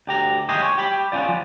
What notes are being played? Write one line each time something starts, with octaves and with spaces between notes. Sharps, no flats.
D2 G4 A#5
D#2 A2 G4 G#4 D#5 C6
C#5
G4 B5
B3 C#4 D#4 F4 D5
F3